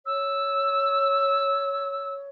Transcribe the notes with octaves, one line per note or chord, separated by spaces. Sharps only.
C#5 E6